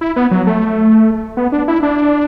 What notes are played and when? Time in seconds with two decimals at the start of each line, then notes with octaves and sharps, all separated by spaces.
0.01 E4
0.16 B3
0.31 F#3
0.47 A3
1.37 B3
1.52 D4
1.68 E4
1.83 D4